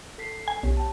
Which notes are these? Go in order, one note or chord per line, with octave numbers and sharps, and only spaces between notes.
A4 B6 C7
G#5
B1 G4 C#5
G5 A5